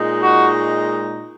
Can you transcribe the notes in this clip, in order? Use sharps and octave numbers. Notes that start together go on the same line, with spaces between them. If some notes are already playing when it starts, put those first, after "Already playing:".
Already playing: A#2 G#3 D#4
F#4